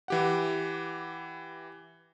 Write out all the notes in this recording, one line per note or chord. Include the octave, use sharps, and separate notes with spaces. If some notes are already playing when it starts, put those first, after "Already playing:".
E3 G4 F#5